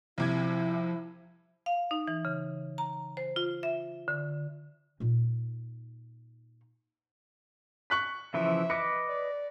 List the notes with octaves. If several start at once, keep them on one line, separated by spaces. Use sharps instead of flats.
C2 C3 F3 E4 G#6
F5
D#4
E3
C#3
A#5
C5
F4
E5
D3
A#2 D#4
C#6 F#6 B6
C#3 E3 F3 E5
B4 D#5 D6 C#7
D5